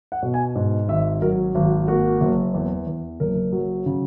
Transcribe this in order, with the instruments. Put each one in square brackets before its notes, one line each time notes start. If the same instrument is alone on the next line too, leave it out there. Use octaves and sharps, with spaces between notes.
[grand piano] F#5
B2
G#5
G#2
G#1 E5
F#3 A#4
G#1
F#4
A#3 F#4
F#1
E2
E2
F#1 A#4
F#3
C#3